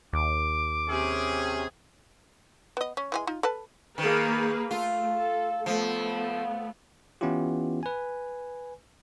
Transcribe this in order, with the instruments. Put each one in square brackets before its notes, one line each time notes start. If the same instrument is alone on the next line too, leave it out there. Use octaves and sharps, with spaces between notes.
[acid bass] D#2 [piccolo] D6
[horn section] C3 C#4 G#4
[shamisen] B3 D#5
C#4
E3 G#3 G#5
D#4 F4
A4 B4 A5
[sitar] D#3 [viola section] A#3 G#4 B4
[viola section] A3 [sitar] F4
[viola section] A4
[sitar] F3 [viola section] A3 B3
[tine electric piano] E3 B3 C#4 E4 F4 G4
B4 G#5